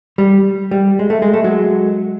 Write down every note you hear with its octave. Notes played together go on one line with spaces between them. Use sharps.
G3
G3
G#3
A3
G#3
A3
F#3 G#3